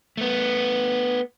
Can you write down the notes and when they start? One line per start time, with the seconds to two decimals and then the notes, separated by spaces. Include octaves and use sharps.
0.17 A3 B3